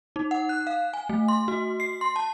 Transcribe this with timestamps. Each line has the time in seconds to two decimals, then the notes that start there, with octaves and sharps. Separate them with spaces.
0.16 D#4
0.31 F#5
0.49 F#6
0.67 F5
0.94 G#5
1.09 A3
1.28 C6
1.48 F#4
1.80 C7
2.01 C6
2.16 A5